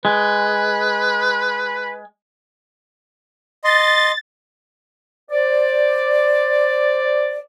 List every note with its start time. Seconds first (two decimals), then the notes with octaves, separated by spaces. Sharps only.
0.05 G#3 B4
3.64 D#5 C6 A6
5.30 C5 D5